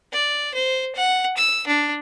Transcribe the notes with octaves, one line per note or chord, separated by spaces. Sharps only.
D5
C5
F#5
E6
D4